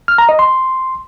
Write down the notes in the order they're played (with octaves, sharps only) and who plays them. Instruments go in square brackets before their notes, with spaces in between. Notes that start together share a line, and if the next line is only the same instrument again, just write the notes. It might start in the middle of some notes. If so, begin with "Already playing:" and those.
[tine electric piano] F6
A#5
D#5
C6